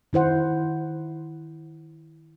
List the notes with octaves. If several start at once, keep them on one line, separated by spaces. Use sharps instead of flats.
D#3 E4 C5 F#5